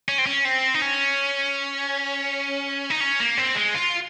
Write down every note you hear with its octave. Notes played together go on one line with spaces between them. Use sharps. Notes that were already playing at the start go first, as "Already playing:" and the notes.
C#4
C4
C#4
C4
D#4
C#4
D#4
C#4
A#3
C4
G#3
F4